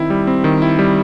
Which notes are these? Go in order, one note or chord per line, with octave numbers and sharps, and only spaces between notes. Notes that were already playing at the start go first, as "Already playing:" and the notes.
Already playing: D#3 C4 E4
G3
C4
D#3
E4
G3